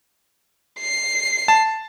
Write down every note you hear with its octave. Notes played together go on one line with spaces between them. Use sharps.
C7
A5